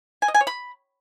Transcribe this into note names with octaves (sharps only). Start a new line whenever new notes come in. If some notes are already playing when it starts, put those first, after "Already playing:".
G#5
D#5
G#5
C#5
B5